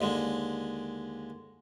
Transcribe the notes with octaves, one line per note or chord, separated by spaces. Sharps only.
D#2 D3 G#3